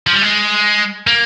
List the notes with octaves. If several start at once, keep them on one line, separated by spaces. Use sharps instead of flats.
F3
G3
G#3
A#3